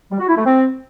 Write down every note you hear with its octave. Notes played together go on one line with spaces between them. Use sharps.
G3
F#4
E4
A3
C4